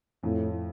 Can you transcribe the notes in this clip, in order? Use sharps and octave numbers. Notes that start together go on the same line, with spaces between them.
F2 A2